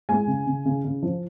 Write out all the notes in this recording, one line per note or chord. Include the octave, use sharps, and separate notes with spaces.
G#3 G#5
C#3
C#3
C#3
C#3
F3